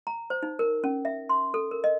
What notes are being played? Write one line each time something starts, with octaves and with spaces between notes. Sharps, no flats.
A#5
C5
D#4
A#4
C#4
E5
C6
A4
A#4
D#5